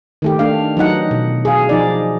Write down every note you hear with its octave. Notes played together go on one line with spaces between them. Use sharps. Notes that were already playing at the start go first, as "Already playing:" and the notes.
D#3 A3 G4
A3 D4 F5
E3 F#3 D#4 F#5
B2
G#4 F5
F3 D#4 D5